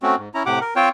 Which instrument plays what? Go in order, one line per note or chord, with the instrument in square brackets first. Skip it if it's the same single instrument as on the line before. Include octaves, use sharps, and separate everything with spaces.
[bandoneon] A3 C4 C#4 F#4
G#2
C#4 E4 A#5
A2 C3 G4 F#5 D6
A#4
C4 F4 C5 C#5 G5